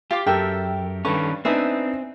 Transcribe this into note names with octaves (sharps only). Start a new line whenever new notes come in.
F4 G4 F5 D6
F#2 G4 A4 A#4 E5 G5
G2 D#3 C#4 A4 B4 C#6
B3 C4 D4 D#4 E5 G#5 D#6